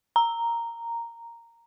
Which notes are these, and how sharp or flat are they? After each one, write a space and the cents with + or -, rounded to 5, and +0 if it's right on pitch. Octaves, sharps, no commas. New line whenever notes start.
A#5 -5